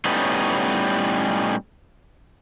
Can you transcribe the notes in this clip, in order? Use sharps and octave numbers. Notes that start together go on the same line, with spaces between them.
A2 G3 B3 C#4 D#4